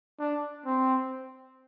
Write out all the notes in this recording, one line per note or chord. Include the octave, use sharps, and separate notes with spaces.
D4
C4